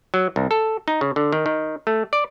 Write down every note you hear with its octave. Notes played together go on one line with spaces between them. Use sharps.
F#3
C2
A4
D#4
C#3
D3
D#3
D#3
A3
D5